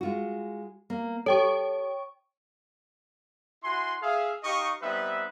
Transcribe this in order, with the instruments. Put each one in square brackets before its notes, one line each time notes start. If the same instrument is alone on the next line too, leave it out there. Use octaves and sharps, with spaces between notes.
[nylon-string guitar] G#3 F4 F#4
A#3
[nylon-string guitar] G4 A4 [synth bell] C#5 G5 C#6
[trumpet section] E4 F#4 G#5 C6
G#4 E5 F5
D#4 G4 D#5 F5 C#6
G3 B3 C4 D#4 B4 E5